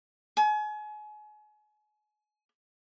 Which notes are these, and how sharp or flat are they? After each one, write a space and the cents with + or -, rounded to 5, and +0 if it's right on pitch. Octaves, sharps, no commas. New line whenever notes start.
G#5 +35